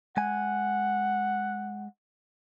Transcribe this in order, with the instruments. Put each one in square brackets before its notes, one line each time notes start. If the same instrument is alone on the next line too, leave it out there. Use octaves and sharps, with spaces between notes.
[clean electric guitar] G#3 G#5 [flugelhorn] F#5